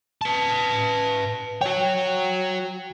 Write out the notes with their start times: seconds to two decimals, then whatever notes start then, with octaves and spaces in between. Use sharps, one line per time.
0.22 B4 A5
1.61 F#4 C#5 G5